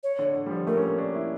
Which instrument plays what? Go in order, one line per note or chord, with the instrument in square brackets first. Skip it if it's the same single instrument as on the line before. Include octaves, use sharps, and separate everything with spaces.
[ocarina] C#5
[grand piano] D3
D3
G3
F3
[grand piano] A3 [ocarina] A#4
[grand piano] C#4
A#3
D4
E4